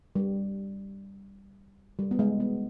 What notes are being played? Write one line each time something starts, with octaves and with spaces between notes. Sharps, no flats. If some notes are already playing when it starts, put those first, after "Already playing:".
G3
G3
B3
G#3
B3